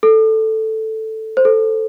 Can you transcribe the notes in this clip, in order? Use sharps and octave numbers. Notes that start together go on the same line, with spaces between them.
A4
C5
A4